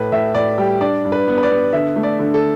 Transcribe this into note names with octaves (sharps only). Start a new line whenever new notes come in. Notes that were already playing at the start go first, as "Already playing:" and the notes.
Already playing: A2 B4
A2 E5
A2 D5
G3 G4
D4 D5
G2
B4
B3
B4
D5
B3
D3 E5
A3
D5
D3
A4